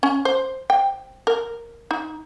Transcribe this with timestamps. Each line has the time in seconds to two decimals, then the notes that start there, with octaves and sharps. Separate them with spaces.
0.03 C#4
0.25 C5
0.70 G5
1.27 A#4
1.91 D#4